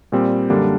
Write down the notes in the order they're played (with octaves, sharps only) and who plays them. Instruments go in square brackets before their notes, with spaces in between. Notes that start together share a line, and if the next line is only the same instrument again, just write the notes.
[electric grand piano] A#2 G3 C4
F#2 D3 G3 A#3 D4